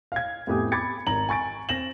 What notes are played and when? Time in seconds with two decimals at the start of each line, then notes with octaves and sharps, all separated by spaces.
0.12 F5 G#6
0.47 F2 A2 B3 G4 G#5 D#6
0.72 B5 D6 G#6 A6 C#7
1.07 G#1 A#5 F#7
1.29 G#5 C#6 A6 D7
1.69 C4 A#6 E7 F#7